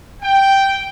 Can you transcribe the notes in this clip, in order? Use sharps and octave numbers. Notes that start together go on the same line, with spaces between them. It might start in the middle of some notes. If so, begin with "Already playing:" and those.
G5